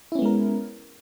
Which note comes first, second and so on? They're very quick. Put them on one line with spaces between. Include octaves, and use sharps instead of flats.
E4 C#4 B3 G#3 A#4